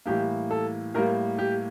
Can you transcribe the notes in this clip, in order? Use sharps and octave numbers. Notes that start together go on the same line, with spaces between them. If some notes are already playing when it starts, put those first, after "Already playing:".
A2 E3 G3 A#3 G4
A4
A2 G3 A#3 A#4
G4